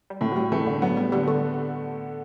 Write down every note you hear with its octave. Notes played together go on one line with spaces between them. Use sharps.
G3
A2 A3
F#3
G3
E3 A3
D3
F#3 B3
G3
D3 G3
A3